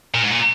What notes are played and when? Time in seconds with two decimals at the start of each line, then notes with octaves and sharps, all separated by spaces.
0.14 A#2
0.24 G#2
0.31 A#2